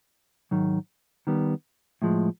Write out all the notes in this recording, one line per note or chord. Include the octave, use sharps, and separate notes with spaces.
G#2 D#3 F#3
D#3 G3 B3
A2 F3 G#3